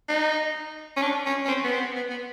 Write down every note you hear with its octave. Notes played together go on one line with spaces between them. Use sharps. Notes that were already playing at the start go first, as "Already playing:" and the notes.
D#4
C#4
D4
C#4
C#4
C4
B3
C4
B3
B3
B3